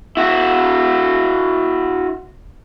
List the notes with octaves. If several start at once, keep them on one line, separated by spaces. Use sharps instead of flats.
E4 F#4